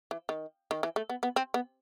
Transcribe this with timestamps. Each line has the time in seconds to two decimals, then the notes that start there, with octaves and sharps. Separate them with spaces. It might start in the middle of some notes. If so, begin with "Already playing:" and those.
0.11 E3
0.29 D#3
0.71 D#3
0.83 E3
0.96 A3
1.09 B3
1.23 B3
1.36 C4
1.54 B3